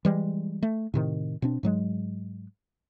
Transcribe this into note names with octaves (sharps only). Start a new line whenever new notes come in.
E3 G3 G#3
A3
A2 C3 D#3
B2 C4 D4
G#2 F#3 G#3